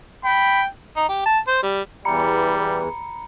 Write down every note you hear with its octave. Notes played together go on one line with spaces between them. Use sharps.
G5 B5
D#4
G4
A5
C5
G3
E2 E3 G3 A#5 B5 C#7